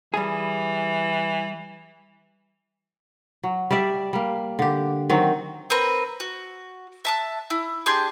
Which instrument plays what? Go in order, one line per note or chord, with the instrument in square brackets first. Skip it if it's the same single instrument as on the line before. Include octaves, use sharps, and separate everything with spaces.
[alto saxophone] E3 [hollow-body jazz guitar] G3 G#4
[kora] F#3
G3 G4 D5 E5
G3 A#3
D3 G4
D#3 F#3 C4
[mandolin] C4 A#4 B4
F#4
E5 A5 F#6
E4
D4 G4 G#4 C6